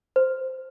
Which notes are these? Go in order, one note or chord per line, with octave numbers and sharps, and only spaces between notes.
C5